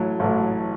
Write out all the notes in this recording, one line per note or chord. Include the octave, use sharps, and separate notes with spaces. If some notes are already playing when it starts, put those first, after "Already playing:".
Already playing: A1 A2 F#3
A1 A2 F#3